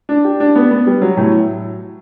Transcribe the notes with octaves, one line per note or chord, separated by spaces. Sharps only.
D4
G4
D4
B3
B3
G3
F#3
A2